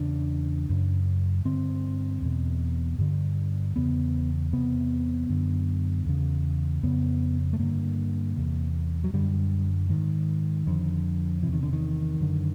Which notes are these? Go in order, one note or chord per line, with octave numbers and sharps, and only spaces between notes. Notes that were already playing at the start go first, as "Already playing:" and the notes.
Already playing: E2 C#3 D4
F#2 C#3
G2 D3 C4
E2 B2
G2 D3
E2 C#3 B3
E2 C3 B3
F#2 D3
E2 C#3
F2 C#3 B3
A3
G2 D3 A#3
E2 C3
F#3
F#2 D3 G3
G#2 D#3
F2 D3
E2 C3 E3
D#3
D3
D#3
F#2 D3